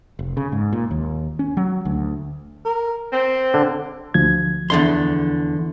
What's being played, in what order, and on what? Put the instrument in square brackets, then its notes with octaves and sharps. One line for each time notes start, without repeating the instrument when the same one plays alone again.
[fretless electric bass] F1
C#3
G#2
A#2
D#2
C#4
F#3
D2
[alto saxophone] A#4
C4
[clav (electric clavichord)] D3
[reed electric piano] D2 F3 G#6
[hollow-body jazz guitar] E2 D3 C6